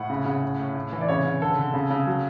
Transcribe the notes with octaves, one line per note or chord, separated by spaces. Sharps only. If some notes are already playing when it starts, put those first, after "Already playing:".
Already playing: A2 F#5
C#3
C#3
A2
A2
A2
E3
D5
C#3 C#5
C#3
D3 A4
D3
C#3
C#3
F#3